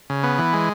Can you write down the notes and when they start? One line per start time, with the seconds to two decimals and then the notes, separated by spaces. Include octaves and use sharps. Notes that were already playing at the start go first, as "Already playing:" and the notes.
0.10 C#3
0.23 B3
0.38 E3
0.53 G#3